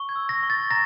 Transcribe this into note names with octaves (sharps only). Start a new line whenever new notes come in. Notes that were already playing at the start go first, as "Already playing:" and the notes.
Already playing: C#6
G#6
E6
A#6
C#6
A6
A#5 A#6